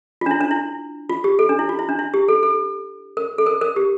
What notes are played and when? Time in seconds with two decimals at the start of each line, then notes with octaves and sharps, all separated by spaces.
0.21 F4
0.26 D4
0.31 E4
0.41 D4
0.51 E4
1.09 F4
1.24 G4
1.39 A4
1.49 D4
1.59 E4
1.69 F4
1.79 E4
1.89 D4
1.99 E4
2.14 G4
2.28 A4
2.43 A4
3.17 A#4
3.38 A4
3.46 A#4
3.61 A#4
3.76 G4